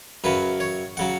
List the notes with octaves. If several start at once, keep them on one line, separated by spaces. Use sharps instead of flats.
F#2 C#3 F#3 B4
C#5
C#3 F#3 F#5